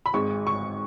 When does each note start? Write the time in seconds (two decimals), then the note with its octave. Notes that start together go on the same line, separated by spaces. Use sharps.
0.06 B5
0.13 G#1 G#2 G#3 C#6
0.47 C#6